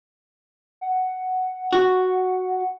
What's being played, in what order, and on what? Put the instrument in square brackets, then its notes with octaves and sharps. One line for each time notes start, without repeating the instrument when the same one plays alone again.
[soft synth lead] F#5
[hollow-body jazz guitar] F#4